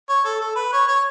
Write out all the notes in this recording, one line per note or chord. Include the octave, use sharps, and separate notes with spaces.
C#5
A4
A4
B4
C#5
C#5